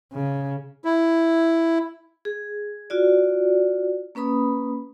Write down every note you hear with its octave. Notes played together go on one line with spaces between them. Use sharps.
C#3
E4
G#4
F4 F#4 D5
A#3 C#4 B4 B5 D#6